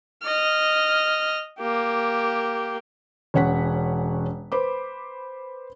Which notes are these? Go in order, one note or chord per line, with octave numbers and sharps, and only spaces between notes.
D#5 F6
A#3 G4
E1 C#4 C#5 F#5 B6
B4 C5 B5 D6